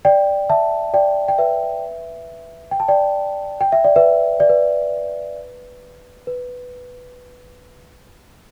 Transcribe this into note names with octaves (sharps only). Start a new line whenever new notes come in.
D5 G5
E5 A5
D5 G5
G5
B4 E5
G5
A5
D5 G5
G5
E5
D5
B4 E5
D5
B4
B4